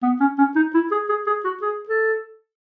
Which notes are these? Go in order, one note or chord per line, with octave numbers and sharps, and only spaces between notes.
B3
C#4
C#4
D#4
E4
G#4
G#4
G#4
F#4
G#4
A4